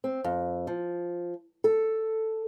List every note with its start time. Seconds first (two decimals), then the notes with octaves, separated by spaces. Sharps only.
0.04 C4
0.24 F2
0.67 F3
1.64 A4